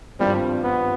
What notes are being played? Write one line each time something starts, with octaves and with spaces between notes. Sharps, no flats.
G#1 G2 F3 G3 C4
B3